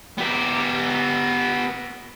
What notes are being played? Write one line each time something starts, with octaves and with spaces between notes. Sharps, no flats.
B3 G4